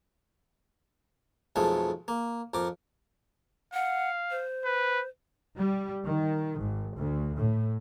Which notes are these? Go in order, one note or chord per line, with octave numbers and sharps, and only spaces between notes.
B1 F2 G#3 A3
A#3
F2 A#4 D6
F5 F#5
C5
B4
G3
D#3
G#1
D2
A2